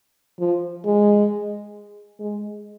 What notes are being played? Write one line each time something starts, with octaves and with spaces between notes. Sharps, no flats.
F3
G#3
G#3